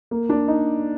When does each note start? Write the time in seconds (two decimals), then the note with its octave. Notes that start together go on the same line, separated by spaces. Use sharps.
0.11 A#3
0.29 D4
0.48 D#4